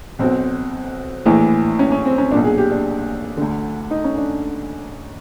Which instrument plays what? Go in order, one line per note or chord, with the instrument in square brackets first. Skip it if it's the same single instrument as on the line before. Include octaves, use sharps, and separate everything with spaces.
[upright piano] B1 B2 C4
A#1 A2 E3
C#4
C#4
C4
C#4
B1 A#2 D4
G#4
G4
D4
D2 D3
D#4
C#4
D4